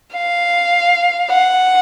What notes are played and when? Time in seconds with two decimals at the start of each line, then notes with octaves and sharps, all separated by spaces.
0.14 F5
1.31 F#5